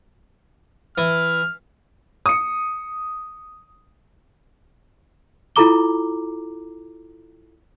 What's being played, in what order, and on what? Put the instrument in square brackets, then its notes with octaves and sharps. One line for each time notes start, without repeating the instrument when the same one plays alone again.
[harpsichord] E3 [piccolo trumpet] F6
[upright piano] D#6 C#7
[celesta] E4 F4 A4 A#5 D6 G7